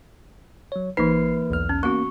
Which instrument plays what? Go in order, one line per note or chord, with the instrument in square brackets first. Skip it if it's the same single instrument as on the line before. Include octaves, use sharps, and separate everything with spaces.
[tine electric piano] F#3 C#5
[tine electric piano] A1 C7 [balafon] E3 D#4 [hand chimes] A#3 B4
[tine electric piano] B1 E2 F6
[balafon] C#4
[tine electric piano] A#3 C#4 [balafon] B3 F#4 [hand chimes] C#6